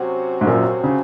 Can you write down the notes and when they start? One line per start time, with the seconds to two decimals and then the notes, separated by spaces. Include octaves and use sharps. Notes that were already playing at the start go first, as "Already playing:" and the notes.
Already playing: C3 F#3 C#4 F#4 C5
0.41 G#2
0.46 F#2 A#2
0.84 C#3